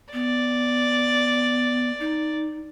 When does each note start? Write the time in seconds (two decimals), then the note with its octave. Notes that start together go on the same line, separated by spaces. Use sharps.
0.13 B3 D5
2.00 D#4